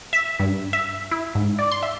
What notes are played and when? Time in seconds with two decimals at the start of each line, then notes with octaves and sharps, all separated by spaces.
0.13 E5
0.39 G2
0.73 E5
1.11 E4
1.35 G#2
1.59 D5
1.72 C6
1.83 E5